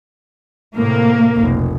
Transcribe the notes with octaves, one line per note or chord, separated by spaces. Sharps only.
A2 C3 A#3
F1 B1